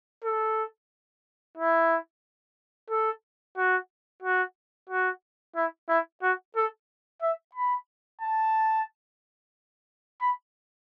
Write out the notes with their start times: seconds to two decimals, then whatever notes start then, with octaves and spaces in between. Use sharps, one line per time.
0.24 A4
1.57 E4
2.90 A4
3.57 F#4
4.22 F#4
4.89 F#4
5.55 E4
5.89 E4
6.22 F#4
6.56 A4
7.22 E5
7.55 B5
8.21 A5
10.21 B5